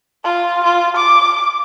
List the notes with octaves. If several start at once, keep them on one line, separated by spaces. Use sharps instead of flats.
F4
F4
D6